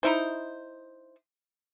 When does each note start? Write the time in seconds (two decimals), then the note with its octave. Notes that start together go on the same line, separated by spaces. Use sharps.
0.03 D#4 E4 C5